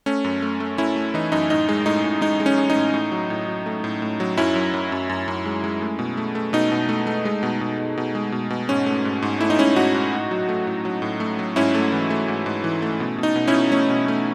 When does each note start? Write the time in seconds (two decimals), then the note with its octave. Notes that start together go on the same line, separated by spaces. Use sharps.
0.06 A3 C#4
0.24 F#2
0.42 A3
0.60 A3
0.78 A3 C#4 E4
0.96 A3
1.14 E3 D#4
1.32 F#2 D#4
1.50 A2 D#4
1.69 G#3
1.86 A2 D#4
2.04 A2
2.21 G#3 D#4
2.40 G#3
2.46 C#4
2.58 G#3
2.70 D#4
2.76 A2
2.94 A2
3.12 F#3
3.30 A2
3.47 F#3
3.66 A3
3.84 A2
4.02 A2
4.20 F#3
4.37 F#2 C#4 E4
4.55 F#2
4.74 F#2
4.92 F#2
5.09 F#2
5.28 F#2
5.46 G#3
5.64 G#3
5.81 A3
5.99 B2
6.17 A3
6.35 A3
6.53 B2 D#4
6.72 B2
6.89 A3
7.07 A3
7.25 G#3
7.43 B2
7.61 B2
7.79 B2
7.97 B2
8.15 G#3
8.32 B2
8.50 B2
8.69 G#2 C#4
8.86 A3
9.05 G#2
9.22 G#2
9.41 A3 E4
9.50 D#4
9.59 G#2 C#4 E4
9.76 G#2 D#4 F#4
9.94 G#2
10.13 A2
10.31 F#3
10.49 A3
10.67 A2
10.85 F#3
11.02 A2
11.20 A3
11.39 F#3
11.56 G#2 C#4 E4
11.74 A3
11.92 E3
12.10 A3
12.28 G#2
12.46 G#2
12.64 E3
12.82 A3
13.00 B2
13.18 B2 D#4
13.36 B2
13.47 C#4 E4
13.54 B2
13.72 A3 C#4
13.90 B2
14.08 A3